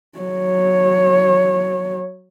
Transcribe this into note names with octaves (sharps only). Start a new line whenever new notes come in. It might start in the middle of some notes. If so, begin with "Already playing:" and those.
F#3 C#5